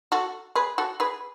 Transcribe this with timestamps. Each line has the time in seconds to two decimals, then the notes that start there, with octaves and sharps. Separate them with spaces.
0.12 F#4 A4
0.55 G#4 B4
0.78 F#4 A4
1.00 G#4 B4